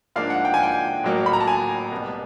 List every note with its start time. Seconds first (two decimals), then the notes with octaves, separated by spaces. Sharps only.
0.16 G#2 F3 A#3 D4 F5
0.30 F#5
0.45 G5
0.54 G#5
0.63 G5
1.04 A1 A2 F#3 A#3
1.26 B5
1.33 A#5
1.40 A5
1.47 G#5
1.91 C2 B2 G3 B3